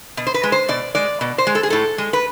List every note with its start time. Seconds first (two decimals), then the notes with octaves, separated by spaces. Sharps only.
0.17 B2
0.27 C5
0.34 B4
0.43 G#3
0.52 C5
0.68 B2 D5
0.95 G#3 D5
1.21 B2
1.38 C5
1.47 G#3
1.55 A4
1.63 G#4
1.70 A2 A4
1.98 G#3
2.13 B4